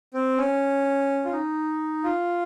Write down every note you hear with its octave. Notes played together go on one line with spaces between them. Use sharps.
C4
C#4
F4
D#4
F4